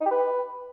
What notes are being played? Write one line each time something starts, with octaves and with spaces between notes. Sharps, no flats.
D#4
G4
B4